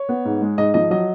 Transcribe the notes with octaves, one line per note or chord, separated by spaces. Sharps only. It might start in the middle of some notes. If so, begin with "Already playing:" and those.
Already playing: C#5
B3
G#2
G#3
G#2 D#5
F3 D#5
F#3 D#5